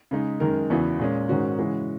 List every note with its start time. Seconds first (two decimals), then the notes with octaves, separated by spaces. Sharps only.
0.11 C#3 G#3 D#4
0.40 F#2 D#3 G#3 D#4 A#4
0.70 E2 C#3 E3 B3 F#4
0.99 A#2 G#3 C#4
1.29 G#2 D#3 G#3 C#4 F#4
1.58 C#3 E3 G#3 C#4 F#4